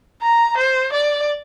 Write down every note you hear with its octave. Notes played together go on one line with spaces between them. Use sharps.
A#5
C5
D5